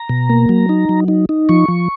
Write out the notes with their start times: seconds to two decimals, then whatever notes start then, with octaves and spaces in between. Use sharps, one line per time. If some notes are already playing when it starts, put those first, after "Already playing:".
Already playing: A#5
0.09 B2
0.30 A#3
0.49 F#3
0.69 D#4
0.89 F#3
1.08 D#4
1.29 D#4
1.49 F3 C#6
1.68 F3